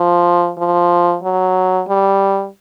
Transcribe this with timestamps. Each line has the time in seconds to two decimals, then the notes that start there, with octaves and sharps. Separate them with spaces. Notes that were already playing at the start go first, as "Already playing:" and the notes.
Already playing: F3
0.58 F3
1.23 F#3
1.88 G3